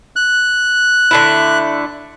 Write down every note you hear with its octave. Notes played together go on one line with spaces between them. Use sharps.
F#6
D3 A3 E4